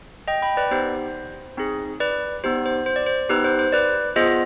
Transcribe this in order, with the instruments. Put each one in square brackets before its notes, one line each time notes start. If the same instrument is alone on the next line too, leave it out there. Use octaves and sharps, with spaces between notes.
[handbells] D#5 G5
G5 B5
B4 D5
B3 D#4 G4 C5
C4 D#4 G#4
B4 D5
B3 D#4 G4 C5
C5
C5
D5
C5
B3 D#4 G4 B4
C5
C5
B4 D5
B3 F4 G#4 C5 D#5